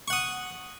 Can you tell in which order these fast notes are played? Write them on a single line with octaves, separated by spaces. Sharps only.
C#6 F#5 D#6